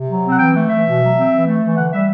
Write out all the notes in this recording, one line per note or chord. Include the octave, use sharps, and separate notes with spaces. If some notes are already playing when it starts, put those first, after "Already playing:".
Already playing: C3
F#3
C4
F#5
E3 G5
A3
E3 E5
B2
F#3
C4
E3
A3
E3
D3 F#5
G3 E5